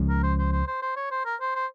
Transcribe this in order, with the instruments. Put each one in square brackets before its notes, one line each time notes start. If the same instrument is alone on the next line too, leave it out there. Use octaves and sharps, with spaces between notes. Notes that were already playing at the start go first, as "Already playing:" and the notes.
Already playing: [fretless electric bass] C#2 C#3 F3 G#3
[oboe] A#4
C5
C5
C5
C5
C5
C#5
C5
A#4
C5
C5